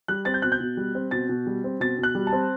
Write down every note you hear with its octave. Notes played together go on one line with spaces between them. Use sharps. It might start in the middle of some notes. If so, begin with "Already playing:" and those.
G3 F#6
C4 A6
G6
B2 F#6
G6
B2
G3
C4
B2 A6
B2
G3
C4
B2 A6
B2 F#6
G3
A5
C4